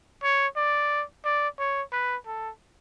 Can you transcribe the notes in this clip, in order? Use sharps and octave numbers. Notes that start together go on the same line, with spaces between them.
C#5
D5
D5
C#5
B4
A4